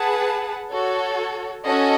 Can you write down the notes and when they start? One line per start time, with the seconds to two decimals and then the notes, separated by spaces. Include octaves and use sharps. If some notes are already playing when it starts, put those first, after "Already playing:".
Already playing: G#4 B4 F#5 A5
0.70 F#4 A4 C#5
1.65 C#4 F#4 A4 D#5